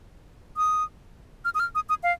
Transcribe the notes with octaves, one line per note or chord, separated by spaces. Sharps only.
D#6
F6
D#6
F6
D#6
D#6
F5